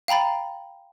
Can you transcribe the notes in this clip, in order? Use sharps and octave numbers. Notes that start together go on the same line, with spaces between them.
F5 G5 A#5 B5 A6